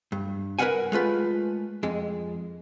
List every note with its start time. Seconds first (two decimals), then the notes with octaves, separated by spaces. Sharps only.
0.12 G2
0.59 A#4 B4 D#5 F5 F#5 G#5
0.92 G#3 A3 F4 B4
1.83 F2 G#3